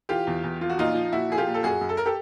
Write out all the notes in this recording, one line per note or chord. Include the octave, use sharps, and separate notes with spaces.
E3 F4 G4
E2
E2
F3 F4
F#4
A#2 D#4 F4
F3
A#2 E4 F#4
F3 G#4
F4 G4
A#2
A4
F#2 F#4 G#4
F#2
A4
A#4
G4 A4